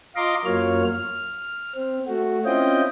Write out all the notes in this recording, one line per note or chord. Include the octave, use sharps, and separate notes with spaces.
F4 D#5 F5 A#5 C6 D6
F#2 F#3 A#3 F4 C#5 F6
F6
C4
A3 F#4
C4 C#4 E4 F4 D#5 G5